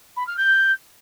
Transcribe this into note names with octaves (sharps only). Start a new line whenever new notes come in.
B5
F6
G6